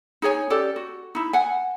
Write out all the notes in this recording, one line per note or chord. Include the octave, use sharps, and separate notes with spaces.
D#4 G#4 C#5 G#5
C#4 G4 A4 D5
F#4
D#4 E4
F#5 G#5